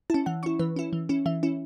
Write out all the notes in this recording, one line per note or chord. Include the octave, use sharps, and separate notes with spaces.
C#4 E4 A5
E3 F#5
C#4 E4 C#6
E3 B4
C#4 E4
E3
C#4 E4
E3 E5
C#4 E4